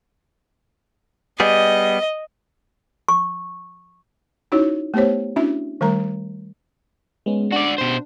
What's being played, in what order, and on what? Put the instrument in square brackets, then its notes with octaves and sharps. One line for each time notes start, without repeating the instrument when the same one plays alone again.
[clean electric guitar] G3 B3 G#4 [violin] D#5
[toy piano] C#6
[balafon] C#4 D#4 E4 F#4 C#5
A3 B3 G4 C5 C#5
C#4 D4 E4 F#4 E5
D#3 G3 A3 A#4 A#5
[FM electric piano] G#3 B3 C#4
[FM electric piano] D4 [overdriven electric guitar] F#4 D5
[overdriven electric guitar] B2 C5